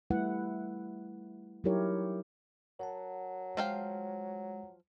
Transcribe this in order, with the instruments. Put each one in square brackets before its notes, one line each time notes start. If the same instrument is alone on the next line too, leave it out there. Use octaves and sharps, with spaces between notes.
[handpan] G3 A3 E4 B4 F#5
F#3 D#4 E4 G4 A#4 C#5
[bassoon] F#3 [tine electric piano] A#4 F#5 A5
[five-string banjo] F3 F5 G5 [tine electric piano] G#3